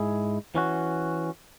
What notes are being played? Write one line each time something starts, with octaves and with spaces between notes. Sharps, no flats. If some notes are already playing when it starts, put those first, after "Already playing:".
Already playing: G#2 G#3 E4 G#4
E3 C#4 F#4